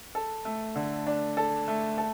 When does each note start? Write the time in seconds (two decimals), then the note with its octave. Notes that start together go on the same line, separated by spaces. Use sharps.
0.15 A4
0.45 A3
0.75 D3
1.07 D4
1.37 A4
1.68 A3
1.98 A4